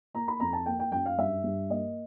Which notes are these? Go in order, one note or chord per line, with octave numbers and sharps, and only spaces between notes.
A#3 A#5
B5
F2 A#5
A5
A#3 G5
G5
F#2 G5
F5
G2 E5
G2
A#3 D#5